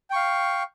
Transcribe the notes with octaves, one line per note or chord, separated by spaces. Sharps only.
F5 G5 C#6